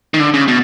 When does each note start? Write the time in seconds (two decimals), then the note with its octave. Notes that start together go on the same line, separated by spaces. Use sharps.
0.14 D#3
0.20 D3
0.34 C#3
0.48 B2